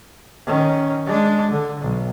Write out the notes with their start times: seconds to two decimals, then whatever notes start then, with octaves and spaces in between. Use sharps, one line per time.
0.46 D#3 C#4
1.06 G#3 D4
1.51 D3
1.81 B1